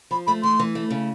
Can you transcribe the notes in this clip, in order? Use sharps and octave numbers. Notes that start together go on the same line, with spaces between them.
F3 B5
A3 B5
E3 C6
E3
A3
C#3